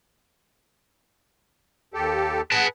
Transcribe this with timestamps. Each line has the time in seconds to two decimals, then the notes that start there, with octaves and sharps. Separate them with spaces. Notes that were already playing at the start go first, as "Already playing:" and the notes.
1.94 D#2 G4 A4
2.52 G#4 B4 F#5 A5